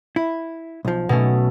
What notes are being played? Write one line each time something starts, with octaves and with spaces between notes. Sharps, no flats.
E4
B1 F3
B1 B2 A3 C#4